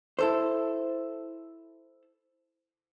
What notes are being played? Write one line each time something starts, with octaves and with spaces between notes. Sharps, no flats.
E4 A4 C5